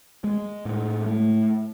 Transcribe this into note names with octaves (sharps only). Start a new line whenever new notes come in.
G#3
A2
A3